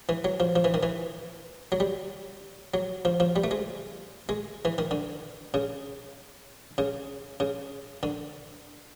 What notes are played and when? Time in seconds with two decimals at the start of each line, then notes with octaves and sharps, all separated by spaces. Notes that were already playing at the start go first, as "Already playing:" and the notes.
0.09 E3
0.24 F#3
0.40 F3
0.56 F3
0.64 E3
0.74 D#3
0.83 E3
1.72 F#3
1.80 G3
2.74 F#3
3.05 F3
3.20 F3
3.36 G3
3.44 A3
3.51 G#3
4.29 G#3
4.65 E3
4.78 D#3
4.91 D3
5.54 C#3
6.78 C#3
7.40 C#3
8.03 D3